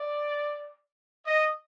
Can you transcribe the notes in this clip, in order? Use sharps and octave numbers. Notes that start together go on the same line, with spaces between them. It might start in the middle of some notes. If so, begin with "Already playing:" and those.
Already playing: D5
D#5